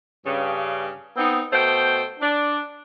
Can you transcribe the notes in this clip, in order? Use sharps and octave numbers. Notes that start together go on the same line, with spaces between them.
G2 C#3
B3 C4 D#4
B2 A3 C5 G5
D4